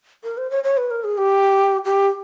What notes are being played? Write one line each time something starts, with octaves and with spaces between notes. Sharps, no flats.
A#4
C5
C#5
C#5
B4
A#4
G#4
G4
G4